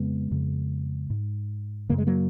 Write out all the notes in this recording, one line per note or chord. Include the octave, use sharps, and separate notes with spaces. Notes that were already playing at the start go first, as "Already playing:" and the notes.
Already playing: F2 C#3 G#3 B3
F2 C#3
G#2
F#2 C#3 A#3
G#3
F#3 A#3